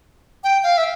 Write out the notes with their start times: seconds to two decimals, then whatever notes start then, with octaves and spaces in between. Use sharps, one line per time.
0.44 G5
0.63 F5
0.77 E5